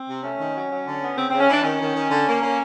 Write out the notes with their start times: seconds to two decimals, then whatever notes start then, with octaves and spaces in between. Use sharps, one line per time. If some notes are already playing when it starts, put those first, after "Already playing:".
Already playing: C4
0.08 C3
0.23 A3 C#4
0.39 D#3
0.55 F#3
0.71 F#3
0.86 D3
1.01 B3
1.17 C#3 C4
1.29 C#3 C4
1.40 C#4
1.48 E3 D4
1.63 D#3 C#4
1.80 D#3
1.95 D#3
2.10 D3
2.27 A#3
2.42 A#3